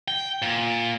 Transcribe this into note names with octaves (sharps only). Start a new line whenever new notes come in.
G5
A#2